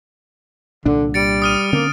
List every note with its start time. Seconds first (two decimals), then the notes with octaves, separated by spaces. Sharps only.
0.86 C2 A#2 D3 D4
1.14 G3 A6 C#7 D7
1.42 D#6 F6 D#7
1.73 D3 A#3 C4 C#4